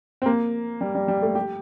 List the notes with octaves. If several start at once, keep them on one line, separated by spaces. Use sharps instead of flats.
C4
A#3
G3
G3
G3
A3
G4